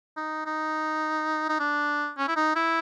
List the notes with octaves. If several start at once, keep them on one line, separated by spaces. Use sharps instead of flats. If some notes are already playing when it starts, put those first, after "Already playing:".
D#4
D#4
D#4
D4
C#4
E4
D#4
E4